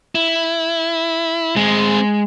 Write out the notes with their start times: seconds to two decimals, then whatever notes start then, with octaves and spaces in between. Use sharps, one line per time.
0.15 E4
1.56 G#3 C4 G#4